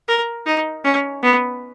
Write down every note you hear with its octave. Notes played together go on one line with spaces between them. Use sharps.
A#4
D#4
C#4
B3